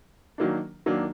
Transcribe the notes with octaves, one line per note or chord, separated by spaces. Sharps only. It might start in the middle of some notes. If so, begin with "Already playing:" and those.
D#3 F#3 A#3 D4
D#3 F#3 A#3 D4